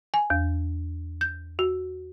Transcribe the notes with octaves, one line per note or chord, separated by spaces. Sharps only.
G#5
E2
G6
F#4